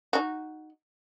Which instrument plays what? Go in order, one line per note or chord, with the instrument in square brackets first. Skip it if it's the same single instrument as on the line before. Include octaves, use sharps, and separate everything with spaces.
[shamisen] D#4 F#4